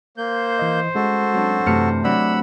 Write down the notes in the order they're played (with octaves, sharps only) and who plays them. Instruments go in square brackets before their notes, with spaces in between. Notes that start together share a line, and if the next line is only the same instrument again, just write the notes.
[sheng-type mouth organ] A#3 G6 [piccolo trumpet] C5
[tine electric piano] E3 D#5
[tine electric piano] G#3 C#4 [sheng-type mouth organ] F#4 A4
[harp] F#3 C4 D4
[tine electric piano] F#2 F6 C#7 [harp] C3 E3 A3
[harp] F#3 C4 D4 [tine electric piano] D5 D6 [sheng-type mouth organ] F#5 B5 E6